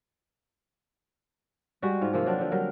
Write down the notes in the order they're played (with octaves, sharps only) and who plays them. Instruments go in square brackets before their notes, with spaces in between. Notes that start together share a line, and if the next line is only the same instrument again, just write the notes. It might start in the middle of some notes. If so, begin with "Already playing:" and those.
[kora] G3 G#3 F#4
G#2 F4
C3 F3 A#3 F4
F#3 C4 D4 D5
D3 F3
F#3 G3 A#4